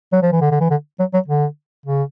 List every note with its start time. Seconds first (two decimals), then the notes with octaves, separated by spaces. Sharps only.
0.13 F#3
0.22 F3
0.32 E3
0.41 D3
0.51 D3
0.61 E3
0.70 D3
0.99 F#3
1.14 F#3
1.28 D3
1.86 C#3